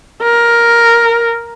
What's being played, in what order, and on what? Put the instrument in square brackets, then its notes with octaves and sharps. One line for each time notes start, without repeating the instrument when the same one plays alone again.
[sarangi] A#4